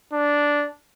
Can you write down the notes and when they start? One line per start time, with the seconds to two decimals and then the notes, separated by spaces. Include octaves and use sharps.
0.13 D4